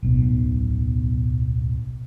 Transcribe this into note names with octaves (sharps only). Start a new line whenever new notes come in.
D1 B1 B2